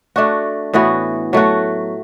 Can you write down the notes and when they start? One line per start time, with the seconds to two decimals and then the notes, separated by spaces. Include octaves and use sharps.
0.16 A3 D4 F#4
0.74 A2 E3 B3 F#4
1.33 F#3 A3 F#4